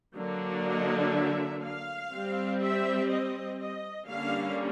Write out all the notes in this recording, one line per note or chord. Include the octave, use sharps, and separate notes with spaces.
D3 F#3 A#3 D4
D#5
E5
F5
G3 C4
E5
D#5
D#5
D3 G3 A#3 C#4 F5